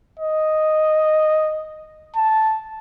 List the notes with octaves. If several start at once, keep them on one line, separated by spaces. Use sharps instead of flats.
D#5
A5